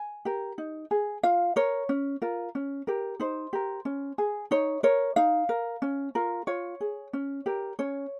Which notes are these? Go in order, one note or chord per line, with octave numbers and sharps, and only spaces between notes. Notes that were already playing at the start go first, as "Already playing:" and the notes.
Already playing: G#5
G4 A#4
D#4
G#4
F4 F5
A#4 C#5
C#4
F4 A#4
C#4
G4 A#4
D#4 C5
G4 A#4
C#4
G#4
D#4 C#5
A#4 C#5
D#4 F5
A#4
C#4
F4 A#4
F4 C#5
G#4
C#4
G4 A#4
C#4 C#5